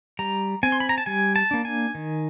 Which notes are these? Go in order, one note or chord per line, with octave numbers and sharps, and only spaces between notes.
G3 A#5
C4 G#5
C6
B5
A#5
A5
G3 G#5
A5
A#3 D4
G#5
D#3